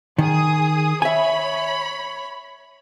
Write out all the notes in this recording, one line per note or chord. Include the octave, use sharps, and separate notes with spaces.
D#3 G#4 D#6
C#5 E5 G#5 B5